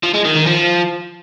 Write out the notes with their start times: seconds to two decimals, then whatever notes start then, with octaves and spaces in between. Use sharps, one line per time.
0.03 F3
0.14 G#3
0.25 D#3
0.36 D#3
0.47 F3